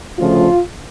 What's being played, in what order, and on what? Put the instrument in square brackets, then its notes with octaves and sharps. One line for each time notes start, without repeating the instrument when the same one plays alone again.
[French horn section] D2 C#3 F3 A3 F4